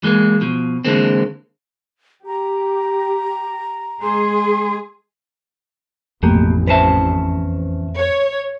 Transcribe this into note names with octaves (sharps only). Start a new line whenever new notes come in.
E3 G#3 A#3
B2 F3
D3 E3 G#3 A#3 C4
G4 A#5
G#3 G#4 C6
A1 F2 B2 A3 A#3 G4
E2 C#4 B4 C5 E5 A5
C#5